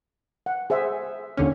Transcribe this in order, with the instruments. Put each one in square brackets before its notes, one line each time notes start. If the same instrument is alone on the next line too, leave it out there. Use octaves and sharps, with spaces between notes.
[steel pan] F#5
G#4 C5 E5
[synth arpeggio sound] D#2 D3 C#4